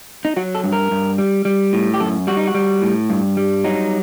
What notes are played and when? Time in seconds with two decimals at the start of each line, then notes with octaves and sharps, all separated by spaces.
0.25 D#4
0.37 F#3 F#4
0.55 A4
0.64 G2
0.73 A#4
0.91 G2
1.18 G3
1.45 G3
1.73 A2
1.94 G4
2.00 F#2 A4
2.27 G3 F#4
2.37 D#4
2.47 F#4
2.54 G3
2.82 A2
3.10 G2
3.37 G3
3.64 F#3 D#4